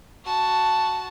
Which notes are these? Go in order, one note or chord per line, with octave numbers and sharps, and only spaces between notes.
F#4 A5